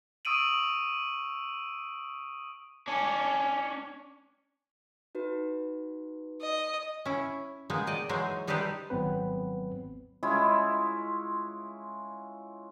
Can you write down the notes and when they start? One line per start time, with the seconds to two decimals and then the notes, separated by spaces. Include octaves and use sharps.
0.25 C#6 D#6 E6 D7 D#7 F#7
2.88 C#4 D4
5.15 D#4 F#4 B4
6.41 D#5
7.05 C#4 E4
7.70 B2 G#3 A#3 D#4
7.87 D5 D#5 G5
8.09 E3 F#3 G#3 D#4 C5 G#5
8.47 G3 D#4 G4 A4 B4 C5
8.90 G#1 F#3 B3 C4 B4
10.23 G#3 C#4 E4 F4